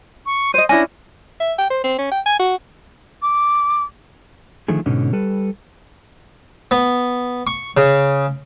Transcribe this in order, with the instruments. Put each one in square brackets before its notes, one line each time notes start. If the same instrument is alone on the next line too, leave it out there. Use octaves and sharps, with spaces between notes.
[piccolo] C#6
[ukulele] C5 D#5 [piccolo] D#7
[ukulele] C#4 D4 E4 [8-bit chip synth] G#5 [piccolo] A#6
[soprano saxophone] E5
G5
C5
C4
C#4
G5
G#5
F#4
[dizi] D6
[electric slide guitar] D3 D#3 F3 A3 G#4
G#2 B2 D3 C#4 D#4
G3 A4 B4
[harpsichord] B3
C#6
C#3